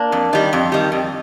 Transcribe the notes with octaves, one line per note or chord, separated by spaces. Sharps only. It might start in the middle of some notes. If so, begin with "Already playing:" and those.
Already playing: A#3 D4
F2
D#3 G3
F2
D#3 G3
F2